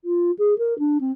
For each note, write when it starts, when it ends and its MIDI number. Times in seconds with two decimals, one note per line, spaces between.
0.04 0.31 65
0.38 0.57 68
0.58 0.77 70
0.78 0.97 62
1.00 1.11 60